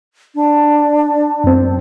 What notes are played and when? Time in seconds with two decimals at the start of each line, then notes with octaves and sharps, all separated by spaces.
0.35 D4
1.44 F#2 C4